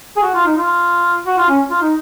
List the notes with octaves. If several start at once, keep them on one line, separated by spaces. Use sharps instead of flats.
G#4
F#4
F4
D#4
F4
F#4
F4
C#4
F4
D#4